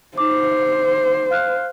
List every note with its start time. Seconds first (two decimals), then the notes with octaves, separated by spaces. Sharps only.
0.18 D#4 C5 D6
1.31 F5 F6 F#6